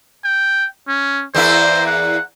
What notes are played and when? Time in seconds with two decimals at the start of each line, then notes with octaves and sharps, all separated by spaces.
0.24 G5
0.88 C#4
1.34 E2 A#3 E4 C5
1.87 F#5